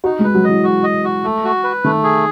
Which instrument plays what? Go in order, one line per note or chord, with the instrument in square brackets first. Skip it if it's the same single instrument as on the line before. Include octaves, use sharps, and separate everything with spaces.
[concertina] D#4 [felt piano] F#4
[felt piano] G#3
[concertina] B4
[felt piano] F#3
[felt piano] E3 [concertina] D#5
[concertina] F#4
D#5
F#4
A3
F#4
B4
[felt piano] D#3 [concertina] A3
[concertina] G#4